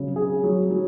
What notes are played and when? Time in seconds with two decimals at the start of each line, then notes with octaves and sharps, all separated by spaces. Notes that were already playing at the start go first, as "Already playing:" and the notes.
Already playing: C#3 F#3
0.16 G#4
0.44 F#3
0.70 F#3